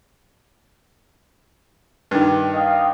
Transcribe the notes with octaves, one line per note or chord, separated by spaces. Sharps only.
G2 D#3
D#5 F5 G5